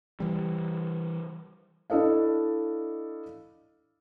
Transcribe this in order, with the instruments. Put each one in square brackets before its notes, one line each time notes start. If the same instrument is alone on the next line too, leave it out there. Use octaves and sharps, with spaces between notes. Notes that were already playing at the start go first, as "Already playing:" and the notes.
[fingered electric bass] E3 G3
[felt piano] D4 E4 A4 D#5 F5